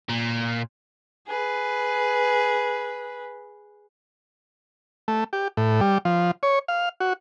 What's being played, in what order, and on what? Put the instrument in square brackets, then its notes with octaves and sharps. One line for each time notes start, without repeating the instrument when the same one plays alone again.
[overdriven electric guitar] A#2
[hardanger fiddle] G#4 B4
[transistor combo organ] A3
G4
A2
G3
F3
C#5
F5
F#4